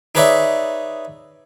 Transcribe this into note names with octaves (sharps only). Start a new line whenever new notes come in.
D#4 G#4 B4 C#5 D5 E5